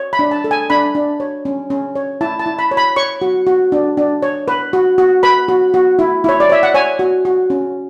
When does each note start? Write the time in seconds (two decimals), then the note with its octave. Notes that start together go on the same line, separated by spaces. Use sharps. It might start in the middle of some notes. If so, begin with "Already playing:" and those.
Already playing: C#5
0.13 B5
0.19 D4
0.31 A5
0.44 A4
0.51 G#5
0.70 D4 B5
0.95 D4
1.20 C#5
1.45 C#4
1.70 C#4
1.95 C#5
2.21 E4 A5
2.39 A5
2.46 E4
2.59 B5
2.71 C#5
2.77 B5
2.96 C#5 C#6
3.22 F#4
3.47 F#4
3.72 D4
3.97 D4
4.22 C#5
4.48 B4
4.73 F#4
4.98 F#4
5.23 B4 B5
5.48 F#4
5.74 F#4
5.99 E4
6.24 E4 C#5
6.40 D5
6.50 C#5 E5
6.63 F#5
6.74 C#5 G#5
6.99 F#4
7.25 F#4
7.50 C#4